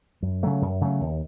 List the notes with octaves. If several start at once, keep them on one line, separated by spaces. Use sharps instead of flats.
F#2
C#3 F#3 A3
F#2
C#3 F#3 A3
D#2